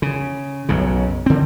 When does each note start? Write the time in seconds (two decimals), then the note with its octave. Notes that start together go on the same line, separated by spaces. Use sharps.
0.02 C#3
0.69 B1 F#2 C#3
1.26 D3 C4